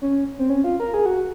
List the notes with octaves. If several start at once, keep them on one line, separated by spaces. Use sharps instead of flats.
C#4
C4
C#4
F4
A#4
G#4
F#4